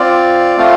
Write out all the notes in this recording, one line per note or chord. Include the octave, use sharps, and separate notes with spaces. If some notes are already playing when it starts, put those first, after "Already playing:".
Already playing: C4 F4 D5
A3 C4 F4 F5